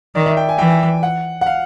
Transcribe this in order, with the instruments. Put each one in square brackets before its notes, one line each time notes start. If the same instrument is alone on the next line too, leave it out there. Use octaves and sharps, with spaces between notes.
[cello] D#3 [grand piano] D5
[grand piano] E5
G5
G#5
[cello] E3 [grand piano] G5
[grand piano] F#5
F#5
F5